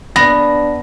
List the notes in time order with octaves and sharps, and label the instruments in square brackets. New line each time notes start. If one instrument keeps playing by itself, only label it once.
[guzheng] B3 [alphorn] D4 [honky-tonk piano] A#6